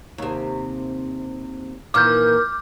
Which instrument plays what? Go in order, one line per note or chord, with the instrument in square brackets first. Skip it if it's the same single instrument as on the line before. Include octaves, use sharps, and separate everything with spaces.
[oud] D#2 C3
[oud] A#2 D#3 E3 [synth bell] D6 F6 G6